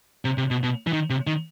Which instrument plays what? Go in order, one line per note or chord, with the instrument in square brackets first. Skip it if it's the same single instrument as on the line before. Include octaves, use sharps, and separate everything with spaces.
[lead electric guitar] C3
C3
B2
B2
E3
D#3
C3
D#3